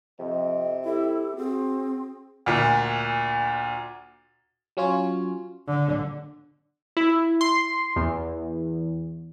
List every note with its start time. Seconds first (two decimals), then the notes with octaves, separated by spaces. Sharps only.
0.19 F2 C3 D#5
0.84 E4 G4 A4
1.37 C4 F#4 G#4
2.46 D2 A#2
4.77 F#3 C#4 F4 C#5
5.67 D3
6.97 E4
7.41 C6
7.96 E2